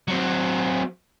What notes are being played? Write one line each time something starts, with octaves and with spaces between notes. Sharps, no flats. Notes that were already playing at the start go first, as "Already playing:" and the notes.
F#3 C4